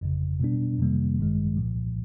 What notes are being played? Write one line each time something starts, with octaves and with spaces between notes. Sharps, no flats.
G1 F2 C#3
B2 G3 B3 D4
F2 C3 D#3 G3 A#3
A1 G2 D#3 G#3
C2 A#2 F3